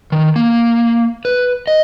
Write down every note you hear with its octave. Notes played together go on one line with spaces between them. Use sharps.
D#3
A#3
B4
D#5